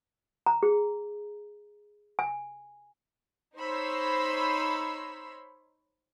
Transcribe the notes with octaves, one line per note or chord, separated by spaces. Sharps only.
A#5
G#4
G#5
D#4 C5 C#5 B5 C6 E6